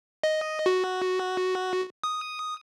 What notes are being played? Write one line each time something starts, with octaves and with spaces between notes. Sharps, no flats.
D#5
F#4
D#6